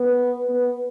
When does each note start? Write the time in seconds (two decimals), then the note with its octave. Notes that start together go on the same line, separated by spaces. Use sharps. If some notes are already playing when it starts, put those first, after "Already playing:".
Already playing: B3
0.49 B3